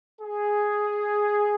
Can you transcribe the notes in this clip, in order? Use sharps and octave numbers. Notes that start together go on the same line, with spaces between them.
G#4